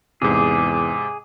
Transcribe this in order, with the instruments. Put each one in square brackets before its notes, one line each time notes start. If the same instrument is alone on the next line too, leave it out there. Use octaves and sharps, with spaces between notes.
[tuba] E2 [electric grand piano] G#2 C3 [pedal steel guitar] G#4 [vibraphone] D6